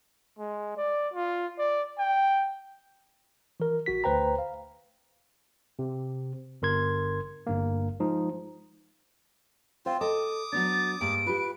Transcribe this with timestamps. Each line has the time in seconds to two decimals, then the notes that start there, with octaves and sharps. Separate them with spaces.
0.38 G#3
0.77 D5
1.13 F4
1.58 D5
1.98 G5
3.60 E3 A#4
3.86 A#1 F#4 B6
4.04 D2 B4 C5 G5 A#5
4.39 F5
5.79 C3
6.62 G1 A#4 C6 G#6
7.47 G1 G2 A#3
8.00 F3 G#3 D#4
9.86 C4 F4 C5
10.01 A4 D#5 D6 D#6
10.52 F#3 B3 D4 A6
11.01 G2 G#3 A#3 D7
11.26 F4 G4 B4